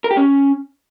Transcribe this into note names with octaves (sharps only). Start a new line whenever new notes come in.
A#4
G4
C#4